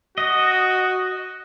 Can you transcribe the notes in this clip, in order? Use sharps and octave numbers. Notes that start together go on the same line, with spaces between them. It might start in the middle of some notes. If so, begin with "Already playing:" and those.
F#4 D#5